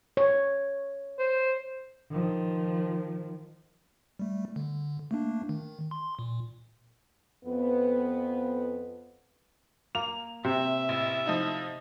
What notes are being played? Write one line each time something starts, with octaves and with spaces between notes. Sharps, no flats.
C#5
C5
D#3 F3
G3 A3
D3
A3 A#3 D4
D#3
C6
A#2
F2 B3
A#3 F7
C3 E5
A1
F3 D#4 E4